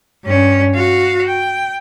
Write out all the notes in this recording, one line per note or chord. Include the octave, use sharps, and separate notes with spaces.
G2 C#4
F#4 F5
G5